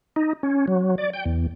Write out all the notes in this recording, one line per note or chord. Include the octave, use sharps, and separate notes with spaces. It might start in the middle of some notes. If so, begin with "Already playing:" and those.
D#4
C#4
F#3
D5
G5
E2